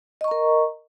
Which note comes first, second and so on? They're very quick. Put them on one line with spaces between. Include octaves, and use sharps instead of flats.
D#5 C#6 A#5 A#4